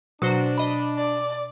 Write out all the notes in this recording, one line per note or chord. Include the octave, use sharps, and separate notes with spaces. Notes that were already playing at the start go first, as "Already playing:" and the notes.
B2 F#3 D4 F#4 C5
D#5 B5
D5